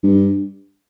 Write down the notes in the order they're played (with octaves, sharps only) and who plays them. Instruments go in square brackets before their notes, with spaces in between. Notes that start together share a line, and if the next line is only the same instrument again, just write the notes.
[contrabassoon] G2